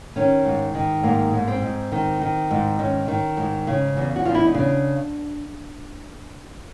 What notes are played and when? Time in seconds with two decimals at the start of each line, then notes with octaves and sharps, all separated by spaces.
0.16 D#3 C#4
0.45 G#2
0.75 D#3
1.03 G#2 A#3
1.33 G#2
1.48 C4
1.62 G#2
1.92 D#3
2.21 D#3
2.51 G#2
2.79 D#3 C#4
3.08 D#3
3.37 G#2
3.67 C#3
3.97 E2
4.16 F#4
4.25 E2 F4
4.35 E4
4.45 D#4
4.55 C#3 D4